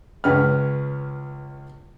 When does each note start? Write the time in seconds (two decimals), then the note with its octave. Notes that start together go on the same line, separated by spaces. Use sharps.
0.24 C#2 C#4 B4 F6